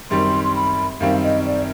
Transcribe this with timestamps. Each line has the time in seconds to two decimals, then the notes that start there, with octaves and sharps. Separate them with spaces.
0.11 F#2 D#3 G3 C4 C6
0.44 C6
0.56 B5
1.00 F#2 D#3 G3 C4 F5
1.24 D#5
1.46 D5